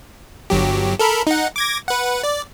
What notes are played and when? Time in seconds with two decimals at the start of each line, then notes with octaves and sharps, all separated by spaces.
0.50 G1 F#3 G4
0.99 A4 A#4 B5
1.27 D#4 F#5
1.56 D6 G#6 A#6
1.88 B4 F#5
2.23 D5